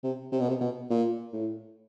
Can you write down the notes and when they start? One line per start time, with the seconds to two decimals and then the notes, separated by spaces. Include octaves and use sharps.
0.03 C3
0.32 C3
0.40 B2
0.49 C3
0.61 B2
0.90 A#2
1.33 A2